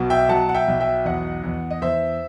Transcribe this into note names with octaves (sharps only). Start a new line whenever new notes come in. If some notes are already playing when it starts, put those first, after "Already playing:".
Already playing: B1 B2
E5 G5
F#3 F#5 A5
F#5
E5 G5
B1
E5 G5
E2 D#5 F#5
E2
D#5
E2 C5 E5